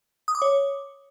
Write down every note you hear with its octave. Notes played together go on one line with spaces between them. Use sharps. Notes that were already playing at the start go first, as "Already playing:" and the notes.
D#6
D6
C#5